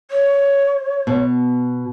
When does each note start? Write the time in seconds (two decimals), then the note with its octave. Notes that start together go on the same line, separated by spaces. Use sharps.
0.11 C#5
1.07 B2